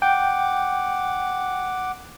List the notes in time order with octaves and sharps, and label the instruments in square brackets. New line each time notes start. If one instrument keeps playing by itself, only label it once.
[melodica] F#5 D6 [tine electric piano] G5